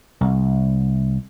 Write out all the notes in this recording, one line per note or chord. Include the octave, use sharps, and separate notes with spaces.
C2